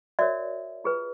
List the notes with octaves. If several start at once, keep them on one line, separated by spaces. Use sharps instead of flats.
F#4 A#4 C#5 D5 E5
F4 G#4 B4